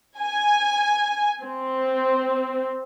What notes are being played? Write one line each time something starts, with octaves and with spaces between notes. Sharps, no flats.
G#5
C4